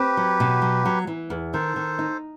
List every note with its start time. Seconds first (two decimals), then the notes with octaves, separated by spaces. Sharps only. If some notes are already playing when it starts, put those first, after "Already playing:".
Already playing: C4 G4 B4
0.17 F#3
0.40 B2
0.62 F#3
0.85 F#3
1.07 E3
1.30 E2
1.53 D#3 A4 C5
1.76 D#3
1.99 D#4